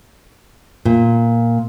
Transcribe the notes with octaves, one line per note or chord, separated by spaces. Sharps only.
A#2